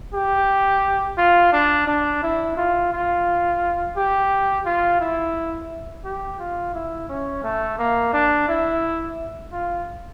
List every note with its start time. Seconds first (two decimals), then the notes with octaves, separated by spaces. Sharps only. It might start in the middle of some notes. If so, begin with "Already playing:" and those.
0.14 G4
1.18 F4
1.53 D4
1.87 D4
2.23 E4
2.57 F4
2.92 F4
3.97 G4
4.66 F4
5.00 E4
6.05 G4
6.39 F4
6.74 E4
7.09 C#4
7.44 A3
7.79 A#3
8.13 D4
8.48 E4
9.52 F4